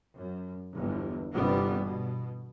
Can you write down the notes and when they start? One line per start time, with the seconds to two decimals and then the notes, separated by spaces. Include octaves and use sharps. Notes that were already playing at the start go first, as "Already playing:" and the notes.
0.16 F#2
0.76 G1 E2
1.33 G1 E2 C3 G3 B3
1.81 B2